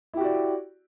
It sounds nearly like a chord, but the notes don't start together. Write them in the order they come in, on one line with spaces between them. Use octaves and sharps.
E4 G4 F#4 D5